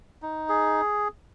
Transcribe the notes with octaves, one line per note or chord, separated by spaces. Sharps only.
D#4
G#4